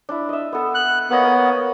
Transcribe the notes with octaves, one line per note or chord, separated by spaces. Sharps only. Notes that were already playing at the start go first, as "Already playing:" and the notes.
D4 E4
D#5 E5
B3 A4
F#6
A#3 B3 C#5 D#5
A#4